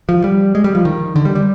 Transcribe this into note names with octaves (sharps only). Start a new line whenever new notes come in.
F3
G3
G#3
G3
F3
D#3
D3
G3
G3